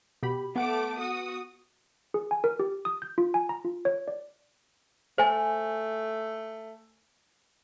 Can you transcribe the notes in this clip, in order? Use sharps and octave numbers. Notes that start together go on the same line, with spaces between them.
B2 G4 B5
A3 B3 F#5 D6
F#4 D#6
G#4
G#5
A#4
G4
D#6
G6
F4
G#5
A#5
F4
C#5
D5
A3 C5 G#5